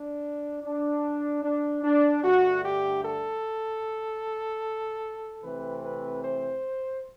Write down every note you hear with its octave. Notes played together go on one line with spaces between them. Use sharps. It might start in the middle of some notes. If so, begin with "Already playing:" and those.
Already playing: D4
D4
D4
D4
G2 D3 A3 F#4
G4
A4
C3 E3 A3 C4 B4
B4
C5